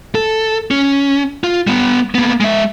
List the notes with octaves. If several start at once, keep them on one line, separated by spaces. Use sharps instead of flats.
A4
C#4
F4
G3 B3
A#3 B3
G#3 E5